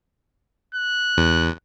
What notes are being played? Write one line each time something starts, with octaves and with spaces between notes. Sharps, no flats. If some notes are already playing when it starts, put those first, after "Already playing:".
F#6
E2